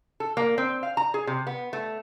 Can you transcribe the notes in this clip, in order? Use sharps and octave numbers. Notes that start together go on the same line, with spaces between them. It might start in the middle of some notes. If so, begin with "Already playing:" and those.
A4
A#3
C4
F5
A#5
G#4
C3
B3
A3